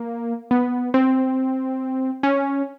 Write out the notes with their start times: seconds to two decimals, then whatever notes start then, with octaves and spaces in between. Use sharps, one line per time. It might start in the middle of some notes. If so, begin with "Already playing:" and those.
Already playing: A#3
0.51 B3
0.94 C4
2.23 C#4